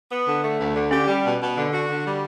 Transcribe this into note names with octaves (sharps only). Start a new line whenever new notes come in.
B3
D3
A3
D2
D3
C#4 G4
G3
B2
B2
D3
F#4
D3
G3